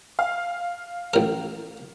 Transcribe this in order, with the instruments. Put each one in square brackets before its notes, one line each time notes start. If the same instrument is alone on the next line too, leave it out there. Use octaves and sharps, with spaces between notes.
[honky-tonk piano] F5
[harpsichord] A1 A#4